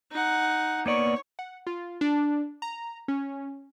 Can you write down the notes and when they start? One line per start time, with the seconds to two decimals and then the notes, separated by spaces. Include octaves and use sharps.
0.12 D#4 F#5
0.86 A#3 B3 C#5 D5
1.39 F#5
1.67 F4
2.01 D4
2.62 A#5
3.08 C#4